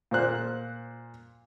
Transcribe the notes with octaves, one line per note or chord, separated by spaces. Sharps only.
A#2 C5 F#6